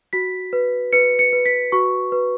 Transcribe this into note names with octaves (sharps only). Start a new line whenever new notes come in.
F#4 B6
B4
B4 C#7
C#7
B4
B6
F#4 C#6
B4